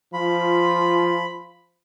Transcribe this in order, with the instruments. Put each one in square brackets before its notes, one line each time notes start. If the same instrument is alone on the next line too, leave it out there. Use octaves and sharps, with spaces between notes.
[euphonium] F3 [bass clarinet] F4 [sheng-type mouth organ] B5